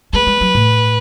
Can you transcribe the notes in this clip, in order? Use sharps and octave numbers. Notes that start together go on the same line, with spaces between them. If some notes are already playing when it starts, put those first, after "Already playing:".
G#3 B4
G#3
F#3
A2